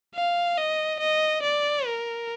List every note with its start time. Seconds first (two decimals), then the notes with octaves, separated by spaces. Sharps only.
0.15 F5
0.57 D#5
1.00 D#5
1.43 D5
1.86 A#4